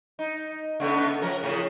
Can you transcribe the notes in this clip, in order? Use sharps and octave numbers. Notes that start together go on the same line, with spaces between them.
D#4
C#3 A3 B3
F3 C#4 A#4
A2 C#3